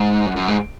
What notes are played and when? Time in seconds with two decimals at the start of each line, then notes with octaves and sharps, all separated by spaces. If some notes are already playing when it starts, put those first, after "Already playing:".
Already playing: G#2
0.26 F#2
0.36 F#2
0.48 G#2